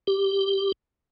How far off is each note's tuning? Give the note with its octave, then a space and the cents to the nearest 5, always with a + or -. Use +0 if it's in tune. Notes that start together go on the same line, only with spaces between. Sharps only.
G4 +0